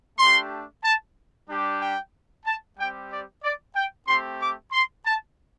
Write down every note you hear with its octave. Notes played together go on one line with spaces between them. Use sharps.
A3 D4 G4 C6
A5
G3 D4 G4
G5
A5
G3 C4 G4 G5
D5
D5
G5
A3 C4 G4 C6
D6
C6
A5